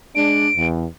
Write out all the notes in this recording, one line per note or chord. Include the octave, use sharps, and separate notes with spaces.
G#3 D4 D7
E2